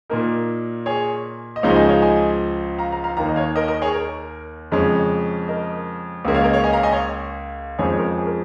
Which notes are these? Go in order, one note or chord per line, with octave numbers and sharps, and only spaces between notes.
A#2 A#3 D#4 A#4
G#4 C#5
D#5
C#2 C#3 F3 G#3 D#4 C#5 F5
D#5 G#5
C#5 F5
D#5 G#5
F5 A#5
F5 A#5
F5 A#5
D#2 D#3 A#3 F5 A#5
D#5
C#5 F5
A#4 D#5
A#4 D#5
G#4 C#5
A#4
F2 C#3 G#3 C#4
A#4 D#5
C#2 C#3 A#3 C#4
C#5 F5
A#4 D#5
C#5 F5
D#5 G#5
F5 A#5
D#5 G#5
C#5 F5
F2 F3 G#3 C#4 G#4 C#5
C#5
A#4
G#4
A#4